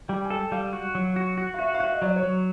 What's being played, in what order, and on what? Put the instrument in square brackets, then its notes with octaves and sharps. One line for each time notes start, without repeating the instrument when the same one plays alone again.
[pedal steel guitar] G3 [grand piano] G5
[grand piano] G#5
[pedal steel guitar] A4 [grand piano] G5
[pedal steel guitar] G3 [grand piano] F5
[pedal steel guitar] F#4
F#3
F#4
F#4
[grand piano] F5
[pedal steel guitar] F#4 [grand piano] E5
[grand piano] F5
[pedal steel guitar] F#4 [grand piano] E5
[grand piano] D#5
[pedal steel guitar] F#3 [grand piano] D5
[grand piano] C#5
[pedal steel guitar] F#3